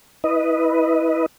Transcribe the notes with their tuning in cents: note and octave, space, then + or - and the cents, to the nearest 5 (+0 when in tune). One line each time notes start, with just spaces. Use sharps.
E4 -20 B4 -5 D#5 +0